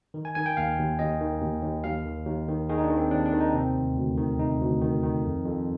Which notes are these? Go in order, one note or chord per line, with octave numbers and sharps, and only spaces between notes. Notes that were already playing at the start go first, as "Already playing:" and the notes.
D#3
G#5
D#3 G#5
G5
D#2 F5
D#2
D#2 D#5
D#3
D#2
D#2
D#2 F5
D#3
D#2
D#3
D#3 G#4
D#4
D4
D#3
C4
D#2 D4
D4
D#3
D#4
C3 C4
D2
D2
D#3
C3 D#4
D2
D#3
D#3
F2
F2